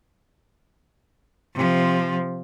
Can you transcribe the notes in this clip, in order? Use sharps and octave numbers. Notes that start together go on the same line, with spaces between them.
C3 F3